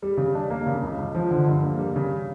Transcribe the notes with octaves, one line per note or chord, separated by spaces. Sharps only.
G3
C#3
D4
A#3
C#3
C#2
C#2
F3
D3
G2
A#3
G3
C#3